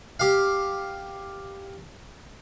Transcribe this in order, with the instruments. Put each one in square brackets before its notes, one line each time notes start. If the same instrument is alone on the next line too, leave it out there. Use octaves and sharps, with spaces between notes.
[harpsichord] G4 F5